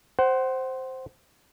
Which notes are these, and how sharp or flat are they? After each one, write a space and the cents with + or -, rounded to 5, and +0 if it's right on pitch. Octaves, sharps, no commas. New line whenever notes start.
C5 +0 F#5 +30